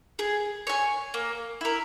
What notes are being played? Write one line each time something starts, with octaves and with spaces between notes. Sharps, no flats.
G#4
C#5 G#5
A#3
E4 A#4